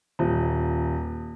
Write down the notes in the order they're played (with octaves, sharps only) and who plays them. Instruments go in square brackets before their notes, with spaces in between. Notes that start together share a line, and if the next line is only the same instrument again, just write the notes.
[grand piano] D#1